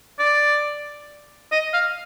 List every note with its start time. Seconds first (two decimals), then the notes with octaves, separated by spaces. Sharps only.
0.19 D5
1.52 D#5
1.73 F5